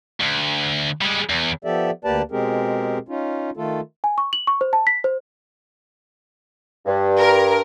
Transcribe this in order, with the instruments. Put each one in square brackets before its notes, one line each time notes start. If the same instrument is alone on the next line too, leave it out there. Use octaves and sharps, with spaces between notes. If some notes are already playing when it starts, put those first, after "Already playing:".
[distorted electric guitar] D2
G3 G#3
E2
[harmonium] F3 B3 G4 A4 D5 E5
D2 A#3 G4 B4 D5 A5
B2 G#3 C4 G4 G#4 A#4
C#4 D#4 F4
D#3 A3 F4 A4
[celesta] G#5
C#6
F#7
C#6
C5
A5
B6
C5
[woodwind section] G2
[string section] A#4